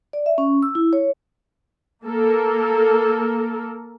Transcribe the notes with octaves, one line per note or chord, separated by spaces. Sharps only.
D5
E5
C#4
E6
E4
C#5
A#3 A4 A#4